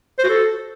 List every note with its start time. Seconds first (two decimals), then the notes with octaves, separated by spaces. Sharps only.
0.18 C5
0.24 F#4
0.29 A4